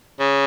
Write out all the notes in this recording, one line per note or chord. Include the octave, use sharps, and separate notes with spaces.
C#3